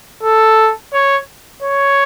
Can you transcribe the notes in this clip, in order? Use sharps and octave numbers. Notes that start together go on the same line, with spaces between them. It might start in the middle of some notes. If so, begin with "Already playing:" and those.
A4
C#5
C#5